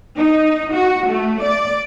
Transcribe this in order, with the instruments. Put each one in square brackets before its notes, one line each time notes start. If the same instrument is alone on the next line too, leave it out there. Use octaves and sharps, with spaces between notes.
[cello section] D#4
F#4
A3
D5